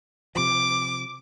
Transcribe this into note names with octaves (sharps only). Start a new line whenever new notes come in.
C3 F3 D6